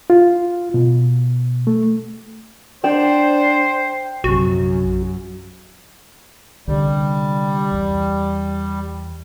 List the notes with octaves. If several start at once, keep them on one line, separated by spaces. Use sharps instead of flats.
F4
B2
A3
D4 C5 G5
A#1 F#2 C3 F#4
C2 D3 G3
E2